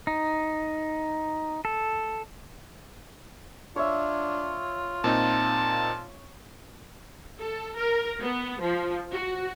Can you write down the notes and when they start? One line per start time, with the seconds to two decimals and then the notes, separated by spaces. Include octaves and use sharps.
0.07 D#4
1.65 A4
3.76 D4 F4 C#5 E5
5.04 A#2 C4 D#4 A5
7.39 A4
7.76 A#4
8.20 B3
8.60 F3
9.11 F#4